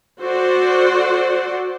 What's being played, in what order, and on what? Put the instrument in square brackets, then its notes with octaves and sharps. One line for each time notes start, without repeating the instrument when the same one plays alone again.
[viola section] F#4 A4 C5 D5 F#5